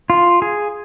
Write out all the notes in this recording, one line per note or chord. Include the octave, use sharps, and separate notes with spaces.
F4
G#4